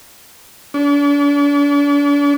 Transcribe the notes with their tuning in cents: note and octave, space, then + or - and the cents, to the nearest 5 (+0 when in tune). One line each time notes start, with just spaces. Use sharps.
D4 -40